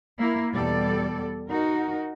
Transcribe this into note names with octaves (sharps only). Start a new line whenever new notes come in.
A#3 E4
E2 B2 G3 A4 D5
D#4 F#4 A#4